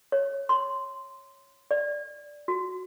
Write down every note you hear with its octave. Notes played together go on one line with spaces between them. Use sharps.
C#5
C6
D5
F#4